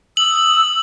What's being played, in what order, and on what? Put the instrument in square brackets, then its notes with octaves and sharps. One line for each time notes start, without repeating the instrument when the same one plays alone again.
[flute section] D#6 E6 [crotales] F#7